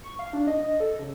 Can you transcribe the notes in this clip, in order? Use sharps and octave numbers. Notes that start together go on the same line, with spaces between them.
C#6
F5
D4
D#5
D#5
A4
C#3